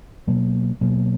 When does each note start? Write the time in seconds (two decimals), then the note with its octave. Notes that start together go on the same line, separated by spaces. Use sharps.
0.27 B2 F#3 A#3
0.81 B2 F#3 A#3